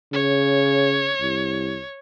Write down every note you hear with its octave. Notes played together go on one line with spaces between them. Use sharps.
C#3 C#5
C2